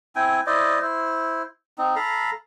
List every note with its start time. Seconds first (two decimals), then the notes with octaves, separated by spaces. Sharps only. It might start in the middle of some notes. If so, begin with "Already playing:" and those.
0.16 C4 E4 G5 G#5
0.46 E4 C5 D5 D#5
0.81 E4 C5
1.78 C4 D#4
1.96 A4 F5 A#5 B5